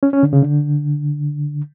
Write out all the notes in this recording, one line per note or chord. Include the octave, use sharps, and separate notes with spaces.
C#4
C#4
D3
C#3
D3